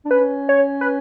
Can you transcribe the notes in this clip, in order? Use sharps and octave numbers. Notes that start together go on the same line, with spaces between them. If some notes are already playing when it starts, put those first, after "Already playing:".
D4
C#4 B4
C#5
B4